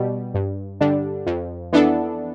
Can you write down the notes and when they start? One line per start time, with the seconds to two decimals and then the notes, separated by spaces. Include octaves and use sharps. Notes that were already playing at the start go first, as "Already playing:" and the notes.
Already playing: B2 G3
0.34 G2
0.81 D3 G3 D4
1.27 F2
1.73 E3 B3 D4 A4